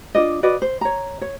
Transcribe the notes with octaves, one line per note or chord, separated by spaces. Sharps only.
D4 F4 D5 D#5
F#4 B4 D5 D#5
C5
C#5 A#5
C#5